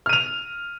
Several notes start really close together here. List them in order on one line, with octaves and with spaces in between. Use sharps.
F6 D#7 F7